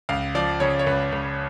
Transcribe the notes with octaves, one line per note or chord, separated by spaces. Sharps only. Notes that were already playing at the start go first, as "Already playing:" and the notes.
C#2 F5
F3 D5
C#3 C#5
C#5
C#2 B4
C#2